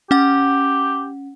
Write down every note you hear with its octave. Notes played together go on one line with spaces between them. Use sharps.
C#4 G4 F#5